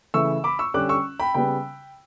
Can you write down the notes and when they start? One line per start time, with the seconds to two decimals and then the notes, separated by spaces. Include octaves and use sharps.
0.14 C#3 E3 A3 C#6 E6
0.44 B5 D6
0.59 C#6 E6
0.74 D3 G3 C#4 D6 F#6
0.89 C#6 E6
1.20 G5 B5
1.34 C#3 G3 B3 G5 B5